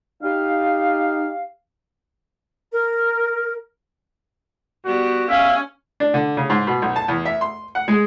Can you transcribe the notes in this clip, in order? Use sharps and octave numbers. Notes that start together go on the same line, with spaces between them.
D#4 G4 F5
A#4
G3 B3 F#4 G4
C#4 E5 F5
D4
D3
C#3
G#2
B2
B1
A5
E2
E5
C6
F#5
G#3